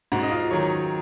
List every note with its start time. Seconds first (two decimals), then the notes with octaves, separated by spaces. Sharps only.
0.12 G#2 F#4 F#5
0.23 D#5
0.31 F4 F5
0.51 D#3 F#3 C#5